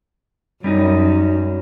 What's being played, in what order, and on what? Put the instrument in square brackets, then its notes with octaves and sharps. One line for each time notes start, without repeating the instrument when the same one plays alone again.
[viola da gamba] F#2 [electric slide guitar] G3 C#4 D#4